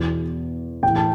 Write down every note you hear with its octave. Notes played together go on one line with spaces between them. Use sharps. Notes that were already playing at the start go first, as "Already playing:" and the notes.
Already playing: E2 B2
A2 E3 G5
A5